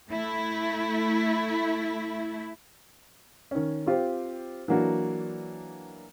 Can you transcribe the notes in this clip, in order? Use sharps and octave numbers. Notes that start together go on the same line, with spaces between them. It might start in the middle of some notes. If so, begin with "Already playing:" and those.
A3 E4
D#3 C#4
C4 F4 G4 C5
E3 F#3 A#3 D4 F#4